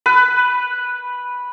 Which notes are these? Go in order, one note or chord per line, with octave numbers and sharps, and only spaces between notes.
B4